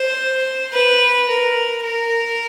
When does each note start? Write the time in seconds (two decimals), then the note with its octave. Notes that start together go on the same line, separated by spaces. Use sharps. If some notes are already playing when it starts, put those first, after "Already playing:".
Already playing: C5
0.72 B4
1.29 A#4
1.83 A#4